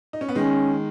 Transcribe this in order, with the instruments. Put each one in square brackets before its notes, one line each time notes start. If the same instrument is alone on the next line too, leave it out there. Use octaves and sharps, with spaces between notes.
[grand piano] D#4
C#4
B3
[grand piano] D#3 G#3 [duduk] C#4